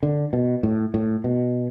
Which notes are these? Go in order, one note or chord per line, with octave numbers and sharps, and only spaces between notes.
D3
B2
A2
A2
B2